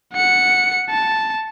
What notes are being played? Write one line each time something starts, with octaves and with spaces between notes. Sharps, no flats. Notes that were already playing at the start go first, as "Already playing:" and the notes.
F#5 C#7
A5